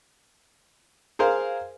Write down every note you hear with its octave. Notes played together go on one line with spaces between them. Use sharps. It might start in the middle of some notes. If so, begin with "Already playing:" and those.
G#4 A#4 C5 F5